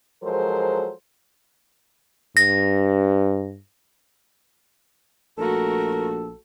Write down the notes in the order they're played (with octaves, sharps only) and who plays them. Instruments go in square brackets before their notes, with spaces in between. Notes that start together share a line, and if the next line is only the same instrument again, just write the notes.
[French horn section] F3 F#3 G#3 A4 A#4 C5
[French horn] G2 [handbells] A#6
[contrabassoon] A#1 [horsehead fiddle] A3 F#4 [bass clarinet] A4 [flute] A#4